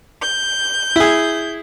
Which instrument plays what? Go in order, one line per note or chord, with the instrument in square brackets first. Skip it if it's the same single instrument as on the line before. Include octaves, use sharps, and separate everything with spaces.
[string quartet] G6
[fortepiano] E4 G#4